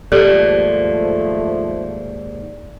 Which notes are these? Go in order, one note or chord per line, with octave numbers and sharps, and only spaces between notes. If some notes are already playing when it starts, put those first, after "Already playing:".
D#2 G#2 F3 A3 G4 A4 D5